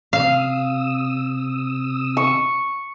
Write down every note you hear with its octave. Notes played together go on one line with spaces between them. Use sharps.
C3 F5 D#6 E6
C#6